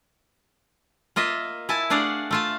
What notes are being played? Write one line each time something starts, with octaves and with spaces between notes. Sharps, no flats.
A#3 F4 D#5 E5
E4 E5 G#5 A5
A3 D4 G#4 D5 F5 F#5
A3 F4 A5